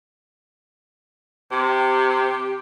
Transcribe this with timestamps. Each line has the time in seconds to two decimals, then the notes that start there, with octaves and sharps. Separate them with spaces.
1.52 C3 G4